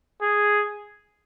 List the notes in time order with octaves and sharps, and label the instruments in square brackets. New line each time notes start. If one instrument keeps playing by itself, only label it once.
[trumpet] G#4